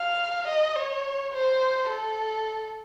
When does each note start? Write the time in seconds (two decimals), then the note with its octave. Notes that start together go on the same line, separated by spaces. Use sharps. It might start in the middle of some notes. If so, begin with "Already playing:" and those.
Already playing: F5
0.48 D#5
0.76 C#5
1.33 C5
1.89 A4